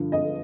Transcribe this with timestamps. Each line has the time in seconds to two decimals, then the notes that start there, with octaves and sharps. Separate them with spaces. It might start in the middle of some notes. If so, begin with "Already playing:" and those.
Already playing: G2 D3 F3
0.12 D#5